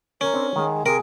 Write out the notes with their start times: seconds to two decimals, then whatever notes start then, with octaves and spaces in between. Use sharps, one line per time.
0.21 C#4 A#4
0.34 C4 D4 C#5
0.56 D#3 G#3 F#5
0.86 C3 G#4 A#4